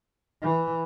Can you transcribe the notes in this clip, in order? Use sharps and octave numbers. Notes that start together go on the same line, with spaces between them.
E3